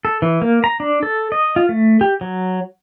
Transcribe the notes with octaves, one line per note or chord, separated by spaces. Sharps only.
A4
E3
A#3
A#5
D4
A4
D#5
F4
A3
G4
F#3